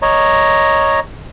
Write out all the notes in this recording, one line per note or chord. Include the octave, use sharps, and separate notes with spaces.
C#5 D#5 A#5